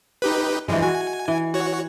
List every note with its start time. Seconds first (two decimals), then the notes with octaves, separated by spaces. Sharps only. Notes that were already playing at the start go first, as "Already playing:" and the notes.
0.22 D#4 G4 B4
0.68 G2 E3 F3 G#3
0.82 F#4 G#5
1.28 E3
1.54 F#4 C#5